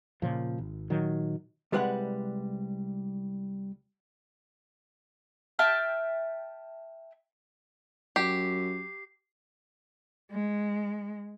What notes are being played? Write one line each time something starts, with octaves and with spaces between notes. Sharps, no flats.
A#2 C#3 F3
G#1
A#2 D#3 F#3
C2 G3 G#3 B4 D5 F#5
E5 G5 A5 F6
F#2 G4 C7
G#3